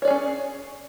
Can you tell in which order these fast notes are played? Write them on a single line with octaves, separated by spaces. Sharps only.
C#5 D5 G#4 C#4